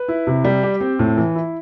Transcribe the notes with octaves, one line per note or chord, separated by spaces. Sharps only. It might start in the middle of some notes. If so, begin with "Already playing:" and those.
Already playing: B4
E4
C3
G3
G4
C4
A2
E3
E4